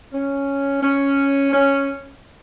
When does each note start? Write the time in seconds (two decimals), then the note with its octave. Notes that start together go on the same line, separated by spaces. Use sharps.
0.12 C#4
0.82 C#4
1.52 C#4